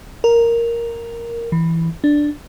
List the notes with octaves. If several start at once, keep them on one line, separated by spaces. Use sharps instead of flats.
A#4
E3
D4